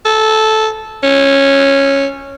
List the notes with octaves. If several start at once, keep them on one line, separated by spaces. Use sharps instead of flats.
A4
C#4